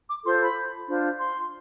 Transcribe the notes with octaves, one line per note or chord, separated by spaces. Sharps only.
D6
F4 A4 C5 C6
B5
D4 F4 C5
C6